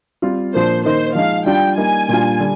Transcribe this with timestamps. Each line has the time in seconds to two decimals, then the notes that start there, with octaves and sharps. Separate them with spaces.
0.22 G3 C4 F4
0.54 A#2 F3 A#3 D4 C5
0.85 D#3 A#3 D#4 C5
1.15 F3 G#3 D#4 F5
1.46 G3 D4 F4 G5
1.77 G3 A#3 D#4 G#5
2.09 A#2 G3 D4 F4
2.39 D3 G3